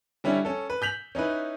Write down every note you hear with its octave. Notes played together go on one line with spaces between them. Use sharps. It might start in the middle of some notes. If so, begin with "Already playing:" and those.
D3 G3 C#4 E4
C#4 A4
B4
G6 B6 F7 F#7
C#4 D#4 E4 B4